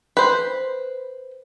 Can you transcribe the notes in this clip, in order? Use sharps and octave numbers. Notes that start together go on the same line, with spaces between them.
B4 C5